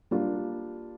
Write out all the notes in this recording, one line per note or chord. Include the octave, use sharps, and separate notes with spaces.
G3 A#3 D4 F4